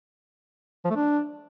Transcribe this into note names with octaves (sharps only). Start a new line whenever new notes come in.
F3
A3
D4